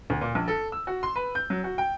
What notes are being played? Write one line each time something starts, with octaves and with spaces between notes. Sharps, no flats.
D2
A#2
A#1
A4
E6
F#4
C6
B4
G6
F#3
F#4
G5